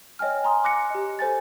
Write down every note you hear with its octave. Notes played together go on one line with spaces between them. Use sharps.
C#5 D#5 G5 G#5 F6
G#5 A#5 C6 D#6
D6 F#6 A#6 C#7
G4 D#5
A4 C5 G#5 A6